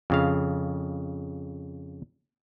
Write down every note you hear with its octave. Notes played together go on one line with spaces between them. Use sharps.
F2 C#3 F5